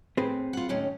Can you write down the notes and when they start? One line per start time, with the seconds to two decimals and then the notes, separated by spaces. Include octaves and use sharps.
0.17 A2 C4 G#4 B4
0.53 F4 F#5
0.69 D#2 A2 C#4